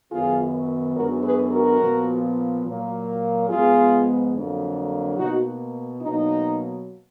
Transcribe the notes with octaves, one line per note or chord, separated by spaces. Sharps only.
F#2 D#3 F#3 B3 F4 G#4
F#2 D3 G#3 B3 F#4 A#4
G#4 B4
F#4 A#4
A#2 F3 B3
A#2 F#3 A#3
G#2 F3 G#3 B3 F4 G#4
F2 D3 F#3 A#3
B2 A#3 D#4 F#4
B2 F#3 A#3 D#4